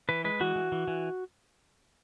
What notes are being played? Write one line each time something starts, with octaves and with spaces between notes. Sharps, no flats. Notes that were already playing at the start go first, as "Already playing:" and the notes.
E3 B4
G#3 B4
E3 F#4
E3
E3
E3